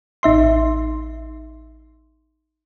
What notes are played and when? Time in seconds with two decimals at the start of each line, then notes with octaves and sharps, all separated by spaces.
0.23 A1 D#4 E5 C6